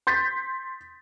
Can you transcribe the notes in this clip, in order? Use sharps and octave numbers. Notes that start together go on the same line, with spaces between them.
C6 G6 A6 B6